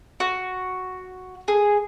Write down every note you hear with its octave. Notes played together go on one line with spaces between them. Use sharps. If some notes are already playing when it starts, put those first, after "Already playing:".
F#4
G#4